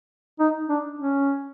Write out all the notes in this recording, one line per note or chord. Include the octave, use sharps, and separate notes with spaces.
D#4
D4
C#4